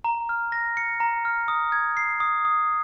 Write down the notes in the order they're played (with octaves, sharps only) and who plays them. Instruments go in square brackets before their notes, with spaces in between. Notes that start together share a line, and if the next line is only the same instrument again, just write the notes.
[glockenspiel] A#5
F6
A#6
C#7
A#5
F6
D#6
G#6
C7
D#6
D#6